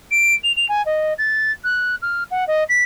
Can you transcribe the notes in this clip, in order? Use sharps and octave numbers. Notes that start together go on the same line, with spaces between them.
D7
F7
F7
G#5
D#5
A6
F#6
F6
F#5
D#5
B6